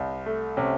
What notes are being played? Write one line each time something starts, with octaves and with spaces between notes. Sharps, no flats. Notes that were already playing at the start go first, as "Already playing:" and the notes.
Already playing: C2
A3
C3 C#4